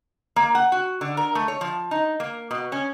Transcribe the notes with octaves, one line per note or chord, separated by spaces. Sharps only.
A#3
F#5
F#4
D3
A#4
A3
C#5
F3
D#4
A#3
B2
C#4